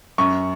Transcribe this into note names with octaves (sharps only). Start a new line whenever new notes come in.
F#2 C#6